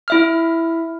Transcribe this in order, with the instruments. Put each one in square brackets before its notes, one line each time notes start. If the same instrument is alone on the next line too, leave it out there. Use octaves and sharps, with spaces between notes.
[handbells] E4 E5 F6